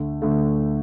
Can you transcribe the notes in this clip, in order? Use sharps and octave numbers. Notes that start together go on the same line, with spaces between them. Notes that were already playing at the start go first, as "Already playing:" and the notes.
Already playing: D2 D3 A3
D2 D3 A3